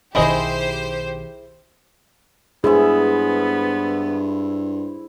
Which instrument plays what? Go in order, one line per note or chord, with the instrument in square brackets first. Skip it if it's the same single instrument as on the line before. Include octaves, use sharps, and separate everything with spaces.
[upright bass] B1 D#3 [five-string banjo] E4 G#4 D#5 [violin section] G4 C5
[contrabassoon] G2 [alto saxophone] B3 [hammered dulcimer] E4 C5 E5 [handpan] G#4